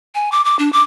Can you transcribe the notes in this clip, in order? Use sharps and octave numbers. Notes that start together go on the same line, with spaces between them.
G#5
D6
D6
D4
D6